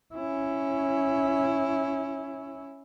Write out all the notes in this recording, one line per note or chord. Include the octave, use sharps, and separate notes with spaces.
C#4 E4